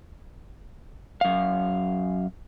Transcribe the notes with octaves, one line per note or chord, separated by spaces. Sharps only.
F#2 F5